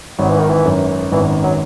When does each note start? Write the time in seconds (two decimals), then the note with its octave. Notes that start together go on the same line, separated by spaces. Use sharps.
0.19 G#1 F#3
0.29 E3
0.39 D#3
0.49 E3
0.65 F#2
1.12 G#1 E3
1.43 F#3